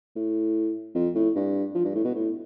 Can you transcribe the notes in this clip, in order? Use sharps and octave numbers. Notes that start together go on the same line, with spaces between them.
A2
F2
A2
G2
F3
G2
A2
B2
A2